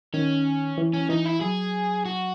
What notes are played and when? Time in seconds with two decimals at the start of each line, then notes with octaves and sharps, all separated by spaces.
0.14 D#3 C#4
0.78 E3
0.93 C#4
1.10 E3 D#4
1.26 E4
1.41 F#3 G#4
2.05 F#4